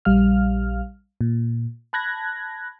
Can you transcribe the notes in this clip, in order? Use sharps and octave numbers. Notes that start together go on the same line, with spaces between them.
A#1 G3 F5 F6
A#2
A5 B5 F#6 G#6 A#6